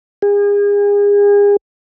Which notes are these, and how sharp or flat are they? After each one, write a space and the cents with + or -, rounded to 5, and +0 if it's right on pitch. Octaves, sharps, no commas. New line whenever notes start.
G#4 -35